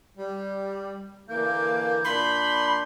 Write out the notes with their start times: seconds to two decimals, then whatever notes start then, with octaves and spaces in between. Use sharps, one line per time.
0.16 G3
1.29 D3 E3 A#3 G6
2.04 A#2 D4 B5 C6